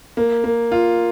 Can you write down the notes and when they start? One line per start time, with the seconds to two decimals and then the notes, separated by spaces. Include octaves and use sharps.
0.17 A#3
0.44 A#3
0.72 F4